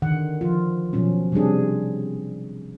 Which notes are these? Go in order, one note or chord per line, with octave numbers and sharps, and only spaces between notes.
D3 D#3 F#5
F3 F4
B2 F3 F#3 C#4
C3 G3 C4 D4 G#4